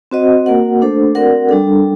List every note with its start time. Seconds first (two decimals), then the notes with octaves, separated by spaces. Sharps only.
0.11 C4 F#4 C5 D#5 F#5
0.46 A#3 F#4 A#4 F#5
0.81 A3 D4 A4 C5
1.15 C4 F#4 A#4 D5 F#5
1.49 G3 D4 A4